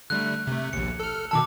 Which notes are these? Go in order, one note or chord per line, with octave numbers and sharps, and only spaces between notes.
D3 G3 A3 F#6
C3 A3
A#1 D#2 C#7
A4 F6
B2 D#3 A5 D6 E6